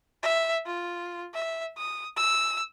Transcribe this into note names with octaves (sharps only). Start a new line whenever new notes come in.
E5
F4
E5
D#6
E6